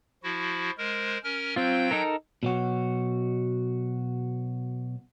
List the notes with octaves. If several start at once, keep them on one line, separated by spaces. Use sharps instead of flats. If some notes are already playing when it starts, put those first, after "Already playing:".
F3 E4 F#4
G#3 A#4 C5
C#4 A#4 F6
F#3 C4 F4 G5 G6
D#4 A4 A#4
B2 F#3 F#4